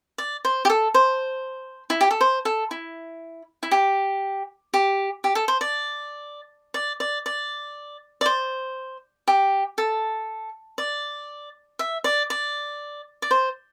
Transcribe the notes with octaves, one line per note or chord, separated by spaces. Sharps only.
D5
C5
G4
A4
C5
E4
G4
A4
C5
A4
E4
E4
G4
G4
G4
A4
C5
D5
D5
D5
D5
D5
C5
G4
A4
D5
E5
D5
D5
D5
C5